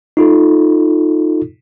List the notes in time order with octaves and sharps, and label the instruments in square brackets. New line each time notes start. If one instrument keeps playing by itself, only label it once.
[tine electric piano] D#4 F4 A4